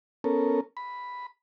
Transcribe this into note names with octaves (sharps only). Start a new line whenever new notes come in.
B3 C#4 A4 A#4
B5